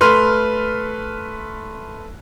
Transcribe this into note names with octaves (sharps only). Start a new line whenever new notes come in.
A3 B4 C6 F6